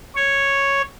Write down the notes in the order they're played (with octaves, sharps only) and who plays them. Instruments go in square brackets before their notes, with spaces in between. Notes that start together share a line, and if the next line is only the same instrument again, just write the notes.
[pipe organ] C#5